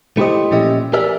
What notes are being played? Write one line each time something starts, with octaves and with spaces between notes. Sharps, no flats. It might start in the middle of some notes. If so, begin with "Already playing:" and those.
A3 E4 G4 C5 D#5
A#2 F3 C#4 G4 D#5 E5
G4 G#4 A#4 D5 E5